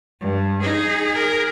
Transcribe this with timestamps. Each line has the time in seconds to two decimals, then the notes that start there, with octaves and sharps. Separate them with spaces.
0.20 G2
0.63 D#4 G#4
1.15 A#4